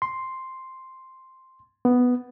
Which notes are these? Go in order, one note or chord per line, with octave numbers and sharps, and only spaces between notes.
C6
B3